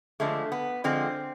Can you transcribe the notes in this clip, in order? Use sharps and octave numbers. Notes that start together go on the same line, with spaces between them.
D3 F3 G#3 A3
B3
D3 F3 G#3 C4